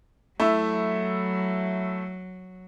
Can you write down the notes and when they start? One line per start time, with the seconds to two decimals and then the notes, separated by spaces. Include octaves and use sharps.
0.40 F#3 A3 E4